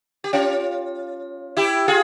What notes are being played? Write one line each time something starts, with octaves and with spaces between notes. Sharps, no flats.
G4
C#4 F4
E4 G4
F4 G#4